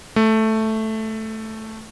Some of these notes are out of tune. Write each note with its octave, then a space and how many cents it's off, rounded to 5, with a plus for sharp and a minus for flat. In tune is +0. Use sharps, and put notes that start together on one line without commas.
A3 +0